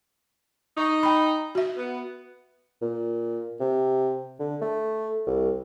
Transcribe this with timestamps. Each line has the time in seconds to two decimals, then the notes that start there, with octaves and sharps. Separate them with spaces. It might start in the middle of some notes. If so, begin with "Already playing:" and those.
0.78 D#4 C#6
1.03 G5 B5
1.55 F#4 E5
1.77 B3
2.82 A#2
3.60 C3
4.39 D3
4.61 A3
5.27 C2